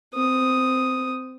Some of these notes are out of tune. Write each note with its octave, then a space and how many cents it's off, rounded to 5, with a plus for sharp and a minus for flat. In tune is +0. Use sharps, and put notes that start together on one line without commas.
C4 -15 D#6 +0